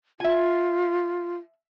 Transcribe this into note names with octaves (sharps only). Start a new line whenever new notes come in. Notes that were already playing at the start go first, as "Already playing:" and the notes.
F4 E5 G#5